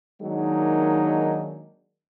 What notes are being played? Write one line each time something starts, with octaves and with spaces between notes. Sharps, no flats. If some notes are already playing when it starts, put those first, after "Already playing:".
D#3 F#3 G#3 A#3 D4 D#4